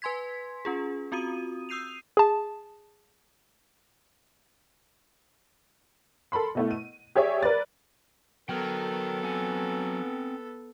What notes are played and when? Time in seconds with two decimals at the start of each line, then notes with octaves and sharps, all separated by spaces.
0.02 B4 G#5 C6 G#6 B6
0.65 C#4 F4 G#4
1.12 C4 F4 F#4 D#6 D#7
1.69 D#6 E6 G6 C7 D#7 F7
2.17 G#4 A5
6.32 A4 A#4 B5 C6
6.55 B2 A3 E4
6.71 D#7
7.15 G4 G#4 C#5 D5 E5
7.43 A#4 B4 D5 A6
8.49 F#3 B3 A4 A#4 G5
9.24 C4 F#5 G#5